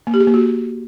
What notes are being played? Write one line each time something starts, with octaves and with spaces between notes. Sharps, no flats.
A#3
G4
G#4
A#3
F#4